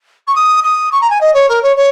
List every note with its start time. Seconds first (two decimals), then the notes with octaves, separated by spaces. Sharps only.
0.27 C#6
0.35 D#6
0.63 D#6
0.92 C#6
1.01 A#5
1.10 G#5
1.20 D#5
1.33 C#5
1.48 A#4
1.62 C#5
1.76 C#5